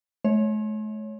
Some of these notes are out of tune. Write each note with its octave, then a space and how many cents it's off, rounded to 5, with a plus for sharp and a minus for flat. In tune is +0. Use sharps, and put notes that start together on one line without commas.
A3 -45 C#5 +0